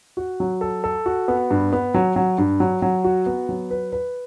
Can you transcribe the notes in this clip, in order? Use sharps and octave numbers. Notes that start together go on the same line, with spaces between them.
F#4
F#3
A4
A4
F#4
B3
G2
B3
F#3
F#3
G2
F#3
F#3
F#4
B3
F#3
B4
B4